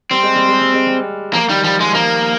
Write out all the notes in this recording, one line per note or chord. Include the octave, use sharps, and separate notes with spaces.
G3 C4
G#3
G3
G#3
G3
G#3
G3
F3 A#3
D#3 G3
F3 G3
G3 G#3
F3 A#3